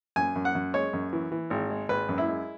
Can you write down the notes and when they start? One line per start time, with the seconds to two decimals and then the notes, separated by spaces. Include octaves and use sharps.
0.16 F#2 G#5
0.35 F#2
0.45 F#5
0.55 F#2
0.74 G#3 C#5
0.93 F#2
1.13 E3
1.32 E3
1.50 G#1
1.70 G#3
1.89 G#1 B4
2.09 F#2
2.18 E4
2.28 G#3